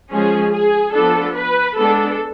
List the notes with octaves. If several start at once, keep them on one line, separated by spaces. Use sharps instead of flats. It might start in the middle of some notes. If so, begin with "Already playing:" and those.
F3 G#3 C#4 G#4
G#4
F3 B3 D4 A4
B4
G#3 B3 D4 A4